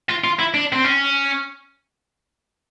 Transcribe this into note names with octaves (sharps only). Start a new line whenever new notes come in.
F4
F4
E4
D4
C4
C#4